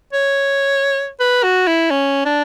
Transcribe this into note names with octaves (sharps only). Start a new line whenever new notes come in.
C#5
B4
F#4
E4
C#4
D4